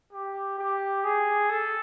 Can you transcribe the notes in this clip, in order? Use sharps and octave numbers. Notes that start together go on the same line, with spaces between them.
G4
G4
G#4
A4